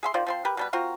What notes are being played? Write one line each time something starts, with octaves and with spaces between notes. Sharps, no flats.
G#4 E5 C6
D#3 F4 C5 D5
F3 C4 C6
G4 A#4 B4
B2 G3 B4
C4 F4 F#4 A#4